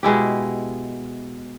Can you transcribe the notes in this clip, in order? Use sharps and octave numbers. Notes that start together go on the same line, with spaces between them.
B2 G#3 E4 G4